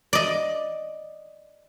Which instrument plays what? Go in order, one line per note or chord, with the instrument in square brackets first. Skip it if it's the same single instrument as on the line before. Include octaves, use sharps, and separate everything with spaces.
[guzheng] D5 D#5